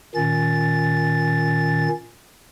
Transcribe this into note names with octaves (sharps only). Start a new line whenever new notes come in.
A#2 D#3 C#4 A6